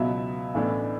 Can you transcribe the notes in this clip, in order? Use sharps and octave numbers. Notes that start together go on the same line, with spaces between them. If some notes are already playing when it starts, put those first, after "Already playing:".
Already playing: C#2 B2 F#3 B3 E5
A1 A2 E3 B3 D4